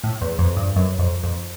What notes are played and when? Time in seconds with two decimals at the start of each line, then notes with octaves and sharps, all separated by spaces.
0.04 A2
0.21 E2
0.39 F2
0.57 G2
0.76 F#2
0.99 F2
1.23 F2